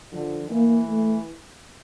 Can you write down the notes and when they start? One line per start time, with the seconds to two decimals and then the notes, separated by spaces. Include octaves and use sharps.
0.12 D3 F3
0.49 E3 A#3
0.87 A3